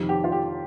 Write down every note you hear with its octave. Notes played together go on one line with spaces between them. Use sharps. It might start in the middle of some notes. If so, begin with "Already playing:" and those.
Already playing: F2 C3 D#3
G4
F4
G4